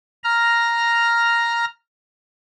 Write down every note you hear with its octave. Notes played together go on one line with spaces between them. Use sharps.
A#5 F6